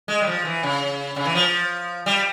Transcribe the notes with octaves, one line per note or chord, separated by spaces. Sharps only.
G#3
G3
F3
E3
C#3
C#3
E3
F3
G3